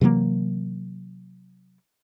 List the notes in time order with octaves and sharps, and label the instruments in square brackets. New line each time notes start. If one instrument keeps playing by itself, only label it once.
[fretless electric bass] C3 E3 F#3 A#3